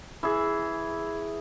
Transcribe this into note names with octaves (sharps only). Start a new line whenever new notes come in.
E3 G#4